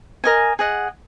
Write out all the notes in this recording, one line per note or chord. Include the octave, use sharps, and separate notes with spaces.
A#4 D#5 G#5
G#4 D#5 F#5